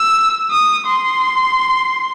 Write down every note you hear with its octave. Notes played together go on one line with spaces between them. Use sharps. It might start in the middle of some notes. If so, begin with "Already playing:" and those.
Already playing: E6
D#6
C6